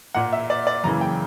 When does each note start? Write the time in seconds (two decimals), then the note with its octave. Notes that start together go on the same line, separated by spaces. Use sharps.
0.14 A#2 A#3 F#5
0.33 E5
0.50 D5
0.67 D5
0.84 F#2 C#3 E3 A#3 A#5
1.01 G5